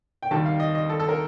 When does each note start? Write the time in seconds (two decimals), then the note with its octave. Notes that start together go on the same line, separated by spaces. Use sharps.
0.23 G5
0.31 D#2 D#3 G3 A5
0.46 F5
0.60 D#5
0.75 D#5
0.89 A4
1.00 A4
1.09 A#4